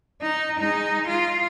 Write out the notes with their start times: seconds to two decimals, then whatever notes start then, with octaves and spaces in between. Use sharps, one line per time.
0.22 D#4
0.60 G#3 D#4
1.08 F4